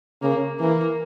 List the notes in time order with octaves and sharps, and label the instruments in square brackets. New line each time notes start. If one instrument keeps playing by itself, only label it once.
[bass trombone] C#3 [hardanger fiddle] A#3
[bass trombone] E3 [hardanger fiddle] A#3